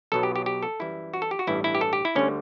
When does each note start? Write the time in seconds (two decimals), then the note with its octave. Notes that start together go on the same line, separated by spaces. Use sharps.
0.12 B1 B2 F#3 A4
0.23 G4
0.36 G4
0.46 G4
0.63 A4
0.80 F#2 E3 G3 E4
1.14 F#4
1.22 A4
1.31 G4
1.39 F#4
1.47 A1 G2 E3 G3 E4
1.64 E4
1.75 G4
1.81 A4
1.93 G4
2.05 E4
2.15 D2 D3 G3 C#4